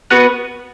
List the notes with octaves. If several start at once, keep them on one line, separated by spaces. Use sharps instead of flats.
B3 F#4 B4